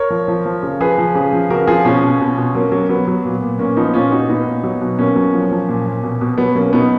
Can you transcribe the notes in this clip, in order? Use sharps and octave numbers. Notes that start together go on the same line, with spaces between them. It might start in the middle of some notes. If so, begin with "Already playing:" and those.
Already playing: A#4 C#5
F3
F3
F3
C#3
F3 G#4 B4
F3
C#3
F3
C#3 F#4 A#4
F3 F4 G#4
B2 C#4 F4
B2
B2
B2
F#3 A#3 C#4
F#3
F#3 B3
F#3
A#2
A#2
A#2 A#3 C#4
F3 B3 D#4
A#2 C#4 F4
A#2 D#4 F#4
A#2 B3 D#4
A#2
F#3
B2
B2 A#3 C#4
F#3
F3
F3
A#2
A#2
B2
B2
F#3 B3
F#3 A#3 C#4
B2 B3 D#4